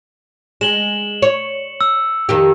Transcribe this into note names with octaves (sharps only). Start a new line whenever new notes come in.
G#3 E7 F#7 G7
C#5 C#7
E6
F2 D#3 G4